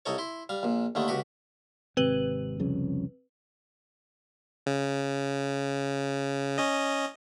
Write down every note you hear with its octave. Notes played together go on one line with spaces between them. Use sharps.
C2 D#4 A4 C#5
E4 C6
G3 F5
A#1 A#2
D#2 D3 D#3 A3
C#2 F#4 G4 B5
G#1 C3 C4 B4 F#7
C2 F2 C#3
C#3
C#4 D#5